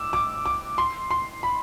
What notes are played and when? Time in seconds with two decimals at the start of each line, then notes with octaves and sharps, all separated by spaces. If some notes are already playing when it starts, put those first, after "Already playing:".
Already playing: D6 E6
0.13 D6
0.46 D6
0.78 C6
1.11 C6
1.43 B5